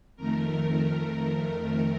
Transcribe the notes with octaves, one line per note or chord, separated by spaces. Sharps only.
F2 D#3 A3 A#4